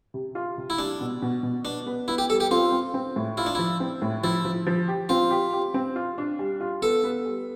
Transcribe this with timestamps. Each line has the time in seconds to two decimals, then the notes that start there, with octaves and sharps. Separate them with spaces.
0.14 C3
0.35 F4
0.58 C3
0.70 E4
0.79 G3 D4
1.01 B2
1.22 B2
1.43 B2
1.64 B3 D4
1.86 B3
2.08 B3 E4
2.18 G4
2.29 G3 A4
2.40 G4
2.51 C4 F4
2.72 C4
2.94 C4
3.16 A2
3.37 E4 F4
3.46 D4
3.55 F3 E4
3.80 C4
4.02 A2
4.23 F3 E4
4.45 F3
4.67 F3
4.88 G4
5.09 C4 F4
5.31 G4
5.53 G4
5.74 C4
5.96 F4
6.18 D4
6.39 G3
6.60 F4
6.82 B3 A4
7.03 B3
7.25 G3